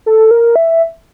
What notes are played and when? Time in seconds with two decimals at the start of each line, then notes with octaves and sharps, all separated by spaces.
0.06 A4
0.31 A#4
0.56 E5